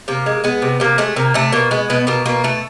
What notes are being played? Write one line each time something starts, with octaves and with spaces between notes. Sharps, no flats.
C3 A#3
G#3
G#3 B3
C3
C3 A#3
G#3 A3
C3 A#3
C3 A3
B2 A#3
G#3 B3
B2 B3
B2 A#3
B2 A#3
B2 A3